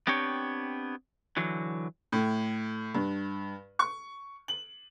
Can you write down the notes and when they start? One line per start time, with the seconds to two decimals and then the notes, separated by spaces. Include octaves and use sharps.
0.07 B3 C4 D4 G4 C#5
1.37 D3 E3 F#3
2.12 A2
2.94 G2
3.79 C#6
4.48 F#7